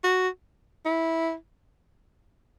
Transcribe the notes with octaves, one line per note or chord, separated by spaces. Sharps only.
F#4
E4